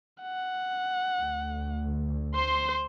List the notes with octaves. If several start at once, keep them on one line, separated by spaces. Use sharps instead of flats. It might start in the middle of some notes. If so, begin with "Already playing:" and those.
F#5
D2
C5 C6